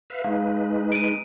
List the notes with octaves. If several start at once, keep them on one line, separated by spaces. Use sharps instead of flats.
B4 E5 F5
G#3 D#4 B4 F5
D7 D#7